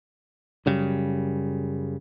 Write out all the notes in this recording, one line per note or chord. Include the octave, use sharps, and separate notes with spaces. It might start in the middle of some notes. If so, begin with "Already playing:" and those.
F#2 C#3 G3